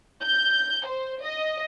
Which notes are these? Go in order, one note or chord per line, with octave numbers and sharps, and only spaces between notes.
G6
C5
D#5